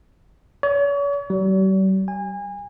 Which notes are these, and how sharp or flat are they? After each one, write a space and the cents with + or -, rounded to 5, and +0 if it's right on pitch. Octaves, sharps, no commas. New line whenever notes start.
C#5 +40
G3 -45
G#5 -30